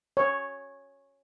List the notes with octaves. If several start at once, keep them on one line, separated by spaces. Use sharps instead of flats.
C#5